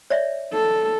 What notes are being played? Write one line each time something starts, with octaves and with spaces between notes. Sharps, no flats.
C#5 D5 E5
A4